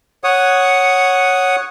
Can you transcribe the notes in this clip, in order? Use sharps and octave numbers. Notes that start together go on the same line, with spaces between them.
C#5 F#5 D#6